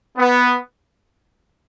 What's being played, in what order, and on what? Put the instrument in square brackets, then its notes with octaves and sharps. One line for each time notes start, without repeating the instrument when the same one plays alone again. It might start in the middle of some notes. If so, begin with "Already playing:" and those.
[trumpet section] B3